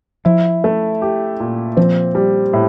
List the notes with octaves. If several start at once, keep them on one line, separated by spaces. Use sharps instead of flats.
F3 E4
A3
G4
A#2
F3 C4
G3
A2